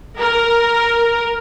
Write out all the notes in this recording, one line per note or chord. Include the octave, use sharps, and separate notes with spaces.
A#4